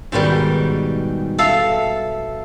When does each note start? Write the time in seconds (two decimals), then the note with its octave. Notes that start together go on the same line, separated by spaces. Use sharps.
0.12 G#2 B2 D#3 G3
1.38 A4 E5 F5